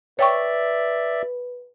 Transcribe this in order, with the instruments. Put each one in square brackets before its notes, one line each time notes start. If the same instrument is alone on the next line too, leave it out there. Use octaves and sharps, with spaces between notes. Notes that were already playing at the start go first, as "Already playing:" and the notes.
[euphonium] B4 [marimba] C#5 G5 C#6 [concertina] D5 E5